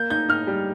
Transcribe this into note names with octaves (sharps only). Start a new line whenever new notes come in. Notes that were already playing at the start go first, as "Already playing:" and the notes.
Already playing: A#3 G6
D#4 G6
D#4 F6
G3